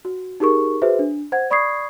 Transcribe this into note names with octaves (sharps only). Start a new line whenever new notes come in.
F#4
D#4 G4 G#4 A#4 C#6
F#4 G#4 B4 C5 E5
D4
C5 F#5 G#6
D5 B5 C#6 D#6 G#6 C7